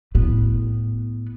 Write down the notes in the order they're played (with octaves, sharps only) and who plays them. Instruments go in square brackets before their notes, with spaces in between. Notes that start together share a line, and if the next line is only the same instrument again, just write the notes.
[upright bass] A2 B3